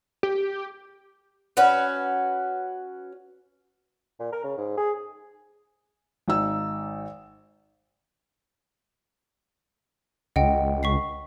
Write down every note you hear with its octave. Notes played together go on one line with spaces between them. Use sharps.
G4
C#4 F#4 B4
A#2
A#4
C#3
G#2
G#4
G#1 D#4 E6
C#2 D#5 F#5 G5
C#6 B6 C7